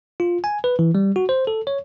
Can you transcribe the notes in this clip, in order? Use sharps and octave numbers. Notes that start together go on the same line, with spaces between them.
F4
G#5
B4
E3
G3
F#4
C5
A4
C#5